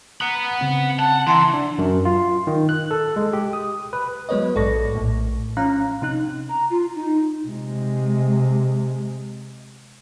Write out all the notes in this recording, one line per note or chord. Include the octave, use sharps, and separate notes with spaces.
F#5 A#5 B5 D#6 F#6
C#3 C4
F#5 A5
E3 F#5 A5 A#5 C6
D4
F#2
F4
D#3
F#6
A4
G#3
G4
D#6
B4
F#3 G#3 B3 B4 C#5 D#5
A#1 G#2 A4 D5 C#6 A#6
A#1 A2
F3 C#4 F5 A#5 F#6
C3 D#4 F#6
A#5
F4
D#4
C3 G#3